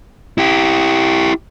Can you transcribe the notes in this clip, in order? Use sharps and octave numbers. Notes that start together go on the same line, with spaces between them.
E4 G4